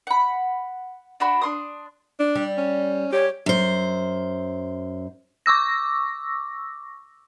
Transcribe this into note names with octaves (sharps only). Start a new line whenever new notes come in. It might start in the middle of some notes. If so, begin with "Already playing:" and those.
F#5 B5
D4 F#4 B5
D4 C6 D#6
D4
G3
C#4
G4 C#5
F#2 C5
C#6 D6 E6 A#6